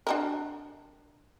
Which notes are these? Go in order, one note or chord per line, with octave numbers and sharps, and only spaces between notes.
D4 F#4 A#4